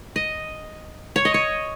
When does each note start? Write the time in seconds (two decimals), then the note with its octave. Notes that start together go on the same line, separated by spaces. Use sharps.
0.16 D#5
1.16 C#5
1.25 D#5
1.34 C#5